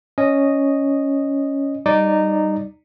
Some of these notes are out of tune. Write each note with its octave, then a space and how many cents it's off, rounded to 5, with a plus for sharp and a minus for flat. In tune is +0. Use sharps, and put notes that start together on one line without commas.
C#4 +0 D#5 -5
G3 +0 D#4 -15 D5 +0